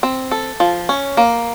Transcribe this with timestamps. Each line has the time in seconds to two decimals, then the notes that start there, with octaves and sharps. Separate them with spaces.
0.03 C4
0.31 A4
0.60 F3
0.89 C#4
1.17 A#3